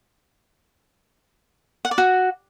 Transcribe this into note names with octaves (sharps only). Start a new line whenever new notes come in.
F#5
D5
F#4